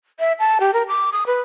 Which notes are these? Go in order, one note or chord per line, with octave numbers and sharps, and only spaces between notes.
E5
A5
G4
A#4
D6
D#6
B4